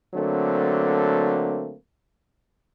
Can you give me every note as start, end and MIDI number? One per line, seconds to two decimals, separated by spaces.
0.14 1.75 50
0.14 1.75 54
0.14 1.75 57
0.14 1.75 58
0.14 1.75 60